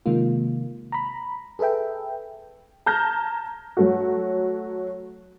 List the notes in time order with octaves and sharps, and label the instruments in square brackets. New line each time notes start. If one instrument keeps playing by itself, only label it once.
[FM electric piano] C3 D#3 G#3 A#3 F4
A#5 B5
G#4 A4 B4 E5 G5
[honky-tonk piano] A5 A#5 F6 G6 G#6 A#6
F#3 A3 F#4